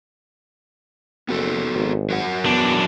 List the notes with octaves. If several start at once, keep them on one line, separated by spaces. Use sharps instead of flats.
F#1 B3 F#4 A4
G#1
F#3 A#4 F#5
E2 B3 D4